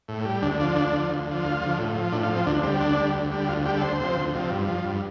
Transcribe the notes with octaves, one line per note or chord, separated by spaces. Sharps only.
A2
G3
D2 D4
D3 F3 D4
D2 D4
D3 F3
D2
D3 F3
D2 F4
D3 F3
A2
F3
A2 D4
F4
F3
C4
D2 D4
D3 G3 C4
D2 D4
D3 G3
D2
D3 G3
D2 F4
D3 G3 G4
A4
D2 C5
C3 F3
D2
C3 F3
G2
F3
G2